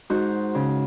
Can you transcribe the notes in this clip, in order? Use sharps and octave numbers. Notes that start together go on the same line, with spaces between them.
G#2 D#4 F#4 C5
C#3